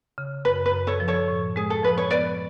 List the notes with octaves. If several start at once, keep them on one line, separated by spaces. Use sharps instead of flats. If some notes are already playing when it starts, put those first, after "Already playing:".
C#3
F#2 B4
B4
F#2
A4 C#5
F3
A4 C#5
A2
G#3 G#4
A4
F3 B4
C#5
B3 B4 D5